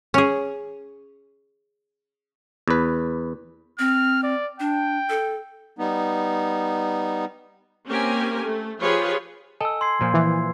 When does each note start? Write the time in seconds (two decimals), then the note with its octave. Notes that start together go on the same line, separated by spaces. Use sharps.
0.14 C#4 G#4
2.68 E2 B4
3.79 C4 F6
4.23 D5
4.60 D4 G5
5.09 A4
5.79 G3 B3 D#4
7.87 A#3 C4 C#4 G4 A#4 G#5
8.43 A3
8.80 F3 F4 G4 G#4 B4 C#5
9.61 A4 D#5 G#5 E6
9.81 C6 G#6 C7
10.01 A#2 F3
10.14 E3